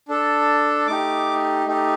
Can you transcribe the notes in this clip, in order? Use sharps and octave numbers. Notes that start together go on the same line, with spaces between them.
D4 A4
A3 D#4 G4 D6
A3 D#4 G4